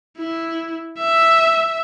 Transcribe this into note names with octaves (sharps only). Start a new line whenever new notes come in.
E4
E5